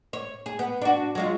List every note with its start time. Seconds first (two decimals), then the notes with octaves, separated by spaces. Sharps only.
0.13 C#5
0.46 G#4
0.59 B3
0.82 D4 F#4
1.15 F#3 G#3 F4